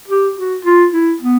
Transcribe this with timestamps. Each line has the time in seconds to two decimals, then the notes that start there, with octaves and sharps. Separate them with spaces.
0.08 G4
0.37 F#4
0.65 F4
0.93 E4
1.21 B3